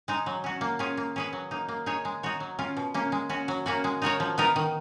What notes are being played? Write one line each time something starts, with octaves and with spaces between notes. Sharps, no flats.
G#3 D#4
F#3
C#4 F#4
A#3
C#4 F4 G#4
A#3
C#4 G#4 B4
F#3
A#3 D#4
A#3
D#4 G#4 C#5
G#3
D#4 F#4 C#5
F#3
C#4 F4
B2
A#3 C#4
G#3
C#4 F#4
F#3
A#3 C#4 F#4
G#3
D#4 F#4 A#4 C#5
F3
B3 D#4 A#4
D#3